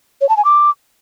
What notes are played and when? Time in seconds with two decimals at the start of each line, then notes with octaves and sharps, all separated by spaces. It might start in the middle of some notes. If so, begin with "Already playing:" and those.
0.21 C#5
0.29 A5
0.37 G#5
0.45 D6